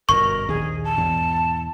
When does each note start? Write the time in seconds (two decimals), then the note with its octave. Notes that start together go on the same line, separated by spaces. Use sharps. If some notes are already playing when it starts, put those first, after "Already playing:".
0.09 G1 F#2 B2 A#4 C#6
0.48 A#1 D#2 G#4
0.84 A5
0.98 E2 G#2 B2